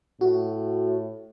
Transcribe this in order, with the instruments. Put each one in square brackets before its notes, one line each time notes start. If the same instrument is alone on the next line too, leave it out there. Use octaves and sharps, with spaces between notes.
[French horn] A2 [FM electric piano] F#4